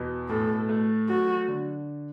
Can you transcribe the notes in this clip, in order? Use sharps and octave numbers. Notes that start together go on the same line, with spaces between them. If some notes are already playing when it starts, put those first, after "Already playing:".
Already playing: E2 B2
A2 A4
A3
F#3 F#4
D3